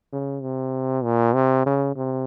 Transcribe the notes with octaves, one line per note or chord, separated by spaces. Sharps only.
C#3
C3
A#2
C3
C#3
C3